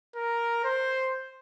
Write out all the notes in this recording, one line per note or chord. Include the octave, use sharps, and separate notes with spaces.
A#4
C5